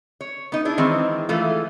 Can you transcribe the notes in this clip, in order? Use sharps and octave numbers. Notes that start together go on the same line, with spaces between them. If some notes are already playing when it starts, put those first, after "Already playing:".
C#5
B3 D#4
D4 E4 G#4
D#3 E3 G#3 C4
E3 G#3 A3 F4